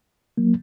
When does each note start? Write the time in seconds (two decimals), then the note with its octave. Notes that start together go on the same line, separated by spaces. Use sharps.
0.37 F#3 A#3